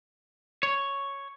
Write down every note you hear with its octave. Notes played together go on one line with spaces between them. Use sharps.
C#5